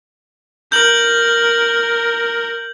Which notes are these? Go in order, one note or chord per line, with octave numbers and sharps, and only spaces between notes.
A#4 G6 F#7